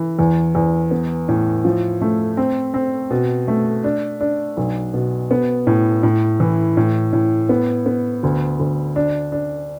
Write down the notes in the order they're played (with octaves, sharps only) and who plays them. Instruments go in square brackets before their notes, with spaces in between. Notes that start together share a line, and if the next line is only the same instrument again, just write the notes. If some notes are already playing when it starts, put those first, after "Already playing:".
Already playing: [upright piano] E3
E2
E2
B3
A2
F3
A3
C4
C4
B2
A3
D4
D4
B1
B2
B3
A2
A2
E3
A2
A2
B3
B3
D2
D2
D4
D4